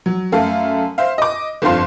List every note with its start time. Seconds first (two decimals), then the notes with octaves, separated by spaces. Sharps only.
0.06 F#3
0.32 F#2 A3 A4 E5 F5
0.98 C5 E5 F5
1.18 D#5 D6
1.62 G1 F2 D4 C5 F5 C6